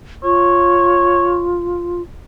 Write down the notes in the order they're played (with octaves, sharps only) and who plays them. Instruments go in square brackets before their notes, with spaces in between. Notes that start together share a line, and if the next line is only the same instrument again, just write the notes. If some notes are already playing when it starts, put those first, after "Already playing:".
[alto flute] F4 [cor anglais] C#5